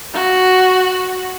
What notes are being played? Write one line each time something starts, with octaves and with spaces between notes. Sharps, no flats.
F#4